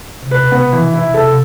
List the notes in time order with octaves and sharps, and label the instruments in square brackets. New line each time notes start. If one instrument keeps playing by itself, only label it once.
[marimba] C3
[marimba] B2 [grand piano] B4
[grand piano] B3
E3
E4
[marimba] C3 [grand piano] A4
[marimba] C3